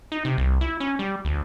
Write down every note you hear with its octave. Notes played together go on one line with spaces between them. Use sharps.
D#4
C3
C2
E4
C#4
G3
D2